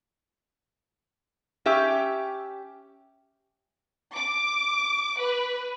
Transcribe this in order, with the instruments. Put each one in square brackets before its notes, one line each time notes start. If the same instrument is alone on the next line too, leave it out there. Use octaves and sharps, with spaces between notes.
[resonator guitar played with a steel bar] C#4 G4 E5
[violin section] D6
B4